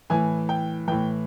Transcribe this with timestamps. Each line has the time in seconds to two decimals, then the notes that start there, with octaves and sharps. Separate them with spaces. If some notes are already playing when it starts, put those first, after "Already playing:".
0.10 A2 E3 G#5
0.49 G5
0.88 A2 E3 G5